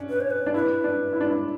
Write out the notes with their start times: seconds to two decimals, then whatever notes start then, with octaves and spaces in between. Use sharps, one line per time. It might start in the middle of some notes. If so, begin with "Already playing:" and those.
Already playing: C#4 D4
0.09 B4
0.20 C#5
0.30 B4
0.46 D4
0.54 E4 B4
0.84 D4
1.13 E4
1.21 D4
1.28 E4